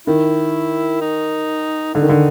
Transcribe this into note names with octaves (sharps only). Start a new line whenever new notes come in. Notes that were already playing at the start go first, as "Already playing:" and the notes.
D#3 E4
D#4
D3 D#4
D#3
D3